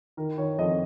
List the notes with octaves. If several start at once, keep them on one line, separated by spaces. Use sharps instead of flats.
D#3 A#4
D#3 C#5
F2 D#5